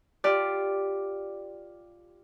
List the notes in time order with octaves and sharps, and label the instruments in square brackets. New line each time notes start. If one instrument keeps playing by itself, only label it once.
[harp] F4 G4 D5